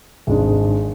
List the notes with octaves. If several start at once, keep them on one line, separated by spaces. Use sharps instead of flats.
G#1 G#2 G#3 D4